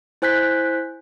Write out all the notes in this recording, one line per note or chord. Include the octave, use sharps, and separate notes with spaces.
E4 C5 G#5 F#6 G6 B6